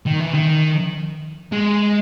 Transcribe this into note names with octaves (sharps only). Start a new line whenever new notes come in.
D#3
E3
D#3
G#3